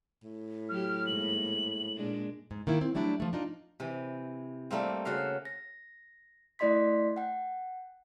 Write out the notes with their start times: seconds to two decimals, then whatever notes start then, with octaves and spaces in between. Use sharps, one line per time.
0.23 A2
0.69 F#3 G4 F6
1.07 G#2 A#3 F#7
1.96 A#2 G#3 D4
2.51 G#2
2.67 D#3 A#3 E4
2.81 C4
2.95 F#3 G3 A3 D4 E4
3.20 F3 A3
3.33 D4 D#4 F4
3.80 C3 E3
4.71 G3 A3 A#3 C4
5.05 C#3 F#4 E5 F5
5.45 A#6
6.59 A3 E4 D5 D#5 C6 B6
7.16 F#5 G5